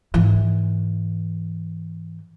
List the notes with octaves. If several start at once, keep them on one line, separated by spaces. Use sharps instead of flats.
G#2 E3